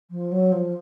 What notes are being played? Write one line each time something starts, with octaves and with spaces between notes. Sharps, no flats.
F3
F#3
F3